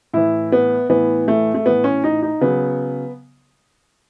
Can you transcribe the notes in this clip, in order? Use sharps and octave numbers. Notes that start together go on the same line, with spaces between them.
A2 E3 E4
B3
A2 E3 B3
A3
A3
A2 E3 B3
C#4
D#4
D#4
C#3 F#3 B3